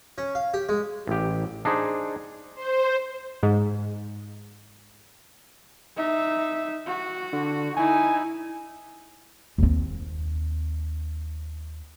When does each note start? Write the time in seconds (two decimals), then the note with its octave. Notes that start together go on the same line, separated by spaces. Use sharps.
0.18 C#4
0.35 F5
0.54 G4
0.69 G#3
1.07 A1 G4
1.65 D4 D#4 G#4 C5
2.55 C5
3.43 G#2
5.96 D#4 E5
6.86 F#4
7.33 D3
7.77 D#4 E4 G#5
9.58 D#2 C4